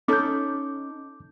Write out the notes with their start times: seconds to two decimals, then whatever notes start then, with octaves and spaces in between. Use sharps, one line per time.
0.08 C#4 D#4 A4 D6 G6